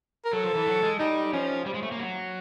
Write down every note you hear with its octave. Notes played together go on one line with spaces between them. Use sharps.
A#4
F#3 A4
F3
E3
F#3
G#3
G3 D#4
F3 C#4
G3
G#3
A3
A#3
F#3